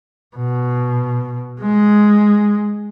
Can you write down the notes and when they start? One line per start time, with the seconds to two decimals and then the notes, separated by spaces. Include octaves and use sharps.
0.37 B2
1.61 G#3